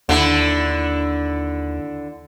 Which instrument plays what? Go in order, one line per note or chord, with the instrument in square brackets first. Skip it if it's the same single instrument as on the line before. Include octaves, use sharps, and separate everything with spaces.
[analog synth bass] D#2 [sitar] D3 E4